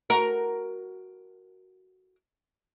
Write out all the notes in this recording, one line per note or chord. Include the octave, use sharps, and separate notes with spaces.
F#4 A#4